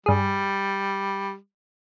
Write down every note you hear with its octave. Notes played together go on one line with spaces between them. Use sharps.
G2 G3 G#4